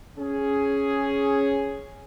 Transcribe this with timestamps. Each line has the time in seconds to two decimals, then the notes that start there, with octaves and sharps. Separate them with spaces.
0.18 C#4 G#4